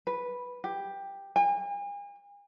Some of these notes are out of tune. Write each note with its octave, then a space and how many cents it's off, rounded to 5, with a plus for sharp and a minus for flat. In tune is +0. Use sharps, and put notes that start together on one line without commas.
B4 -5
G4 +10
G#5 -45